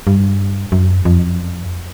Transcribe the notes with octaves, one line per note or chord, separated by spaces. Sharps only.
G2
F#2
F2